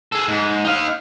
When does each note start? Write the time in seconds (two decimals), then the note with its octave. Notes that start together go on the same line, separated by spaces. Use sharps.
0.12 G#4 A4
0.28 G#2
0.65 D#4 F5